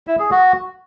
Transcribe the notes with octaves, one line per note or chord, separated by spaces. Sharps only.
E4
G#4
F#4